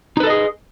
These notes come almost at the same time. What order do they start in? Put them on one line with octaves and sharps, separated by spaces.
D#4 B4 A4 D#5 G#4